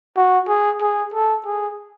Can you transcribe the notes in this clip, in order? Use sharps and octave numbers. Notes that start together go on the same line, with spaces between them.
F#4
G#4
G#4
A4
G#4